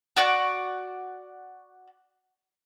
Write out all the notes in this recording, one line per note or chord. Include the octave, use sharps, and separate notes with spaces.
F#4 D5 F#5 C#6